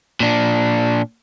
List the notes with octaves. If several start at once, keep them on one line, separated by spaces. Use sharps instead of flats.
A#2 D4